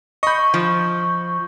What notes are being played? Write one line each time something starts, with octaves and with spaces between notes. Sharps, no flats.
D#5 B5 C#6 G6
F3